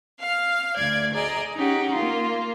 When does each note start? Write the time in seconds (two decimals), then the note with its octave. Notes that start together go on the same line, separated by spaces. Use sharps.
0.20 F5 F6
0.76 D2 D5 G#6
1.13 G#4 D5 D#5 A#5
1.55 C#4 D#4 G4 F#5
1.92 A#3 F4